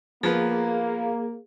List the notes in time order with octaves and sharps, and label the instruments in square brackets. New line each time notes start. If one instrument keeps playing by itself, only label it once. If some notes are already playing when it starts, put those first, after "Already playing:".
[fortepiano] F3 B3 [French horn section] A#3 [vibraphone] G#4